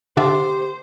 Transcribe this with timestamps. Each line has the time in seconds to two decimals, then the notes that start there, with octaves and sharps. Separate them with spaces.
0.17 D3 D4 G4 C5 E5